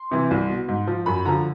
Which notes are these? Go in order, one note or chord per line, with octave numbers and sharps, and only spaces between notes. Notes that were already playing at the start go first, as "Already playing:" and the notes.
Already playing: C6
C3 E3
C2
B2
G#2
F3
F#2 B5
D3 F3 A#5